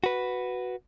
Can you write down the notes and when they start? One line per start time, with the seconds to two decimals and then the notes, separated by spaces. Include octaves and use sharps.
0.04 F#4 B4